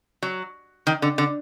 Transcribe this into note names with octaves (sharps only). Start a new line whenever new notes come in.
F#3
D#3
D3
D3